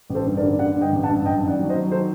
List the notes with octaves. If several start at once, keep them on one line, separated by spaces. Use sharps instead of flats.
A1
A4 C5
G2
A#4 D5
D3
D3 D5 F#5
G2
D#5 G5
A1
F#5 A5
G2
F#2 D#5 G5
D#3
D5 F#5
F#3
C5 D#5
F#3
D#3 A4 C5